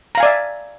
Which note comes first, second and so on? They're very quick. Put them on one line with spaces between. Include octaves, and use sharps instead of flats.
A#5 F5 G#5 D5 E5